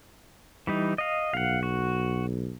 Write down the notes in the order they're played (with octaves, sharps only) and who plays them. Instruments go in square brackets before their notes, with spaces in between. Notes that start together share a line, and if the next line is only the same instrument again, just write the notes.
[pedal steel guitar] E3 G3 D#4
D#5 F5
[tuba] B1 [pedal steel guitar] F5 F#5
[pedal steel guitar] F#4